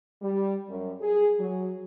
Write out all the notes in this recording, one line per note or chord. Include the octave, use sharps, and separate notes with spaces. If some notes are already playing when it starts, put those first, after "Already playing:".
G3
F#2
G#4
F#3